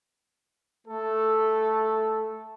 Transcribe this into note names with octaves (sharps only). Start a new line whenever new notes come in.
A3 A4